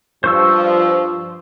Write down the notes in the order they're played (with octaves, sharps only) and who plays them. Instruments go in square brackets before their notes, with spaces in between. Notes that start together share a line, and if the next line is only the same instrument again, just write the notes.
[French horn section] G2 F3 [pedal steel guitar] C5 C#6 E6